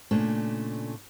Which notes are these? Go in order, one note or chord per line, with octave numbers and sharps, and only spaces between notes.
A#2 C#3 A3 D4